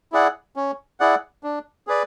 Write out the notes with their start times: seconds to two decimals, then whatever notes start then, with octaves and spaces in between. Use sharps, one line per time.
0.12 E4 G#4 D5 F#5
0.56 C#4
1.00 E4 G#4 D5 F#5
1.44 D4
1.87 G#4 B4 D5